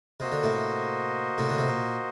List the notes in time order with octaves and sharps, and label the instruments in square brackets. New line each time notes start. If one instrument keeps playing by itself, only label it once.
[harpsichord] C3 [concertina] A#3 F#4 C5 D#5
[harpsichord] D3
A2 C3
A2 C3
D3
C3
A#2